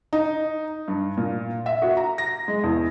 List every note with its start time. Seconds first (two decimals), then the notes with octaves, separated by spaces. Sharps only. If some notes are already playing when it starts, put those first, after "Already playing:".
0.13 D#4
0.88 G2
1.17 A#2
1.66 E5
1.82 F#4
1.97 A#5
2.18 A#6
2.48 G#3
2.64 E2